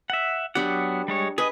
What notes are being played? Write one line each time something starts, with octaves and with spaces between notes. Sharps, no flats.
E5 F#5
F#3 B3 D4 G4 F#5
G3 G#3 C#5
G#4 B4 D#5